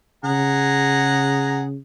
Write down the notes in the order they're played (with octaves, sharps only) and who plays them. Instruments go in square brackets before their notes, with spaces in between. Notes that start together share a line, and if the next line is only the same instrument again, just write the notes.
[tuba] C#3 [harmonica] G#4 F#5 A#5